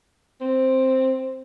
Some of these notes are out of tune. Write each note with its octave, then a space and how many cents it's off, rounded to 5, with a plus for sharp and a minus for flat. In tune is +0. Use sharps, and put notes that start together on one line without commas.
C4 +5